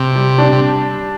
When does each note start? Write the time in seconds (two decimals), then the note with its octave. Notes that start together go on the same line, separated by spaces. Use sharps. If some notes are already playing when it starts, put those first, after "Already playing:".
Already playing: C3
0.15 G3
0.38 D4
0.52 C3